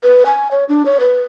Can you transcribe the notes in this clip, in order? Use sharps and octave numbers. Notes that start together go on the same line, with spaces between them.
B4
G#5
C#5
D4
C#5
B4